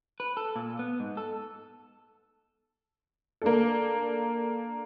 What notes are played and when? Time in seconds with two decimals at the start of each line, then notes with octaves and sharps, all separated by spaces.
0.20 B4
0.37 A4
0.56 A#2
0.79 B3
1.00 G#2
1.17 A4
3.42 A#3 D4 A4